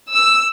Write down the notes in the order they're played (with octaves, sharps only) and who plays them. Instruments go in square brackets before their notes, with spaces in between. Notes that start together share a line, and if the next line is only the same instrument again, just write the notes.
[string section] E6